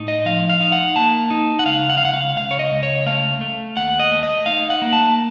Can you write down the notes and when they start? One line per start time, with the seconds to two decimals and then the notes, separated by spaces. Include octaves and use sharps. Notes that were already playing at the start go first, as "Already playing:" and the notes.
Already playing: A2 D#4
0.08 D#5
0.26 F3 F5
0.50 F5
0.61 D#4
0.72 F#5
0.96 A#3 A5
1.31 D#4
1.59 F#5
1.66 C#2 F5
1.90 F#5
1.97 F5
2.02 C#2 F#5
2.13 F5
2.36 C#2 F5
2.51 C#5
2.59 D#5
2.72 C#2
2.83 C#5
3.06 A3 F5
3.41 A3
3.76 D#2 F#5
4.00 D#5
4.11 A3
4.23 D#5
4.46 D#4 F5
4.70 F#5
4.82 A#3
4.93 A5